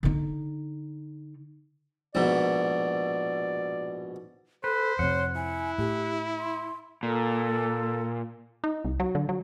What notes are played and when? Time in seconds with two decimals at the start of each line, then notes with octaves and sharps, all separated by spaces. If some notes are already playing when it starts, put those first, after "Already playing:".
0.03 D3 D#4
2.15 A#1 G#2 B2 D5
4.64 A4 B4 C5
4.99 F2 C3 C#5 F#5
5.36 E4 G#5
5.78 A2 G4
6.39 C6
7.03 A#2 A4
8.64 D#4
8.85 C2
9.00 F#3
9.15 D3
9.29 F#3